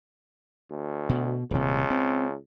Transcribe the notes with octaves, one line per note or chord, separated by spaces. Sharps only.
D2
B2
D#1 C#2 C3
C4